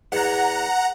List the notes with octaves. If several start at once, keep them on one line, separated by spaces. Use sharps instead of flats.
E2 F#5 A#5